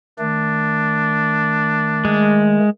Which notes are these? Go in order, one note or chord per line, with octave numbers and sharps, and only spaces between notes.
D#3 A3 D4
G#3